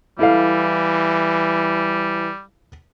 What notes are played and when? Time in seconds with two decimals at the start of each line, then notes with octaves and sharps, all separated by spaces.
0.19 E3 G3 E4 A4 F5